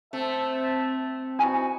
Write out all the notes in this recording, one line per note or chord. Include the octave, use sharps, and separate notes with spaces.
A3 C4 C5 E5 A5
D#4 E4 F#4 G#5